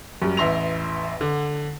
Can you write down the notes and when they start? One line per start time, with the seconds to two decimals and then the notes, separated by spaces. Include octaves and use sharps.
0.22 F#2 G3
0.37 A1 E2 E5 C6 A#6 F7
1.21 D3